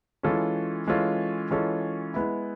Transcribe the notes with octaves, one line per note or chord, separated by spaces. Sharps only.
E3 G#3 C#4 F4 A4
E3 G#3 C#4 F4 A4
E3 G#3 C#4 F4 A4
G#3 B3 E4